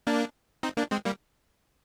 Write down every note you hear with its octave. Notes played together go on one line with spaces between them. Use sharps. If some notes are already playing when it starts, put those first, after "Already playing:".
A#3 D4
C4 D#4
A#3 D4
G#3 C4
G3 A#3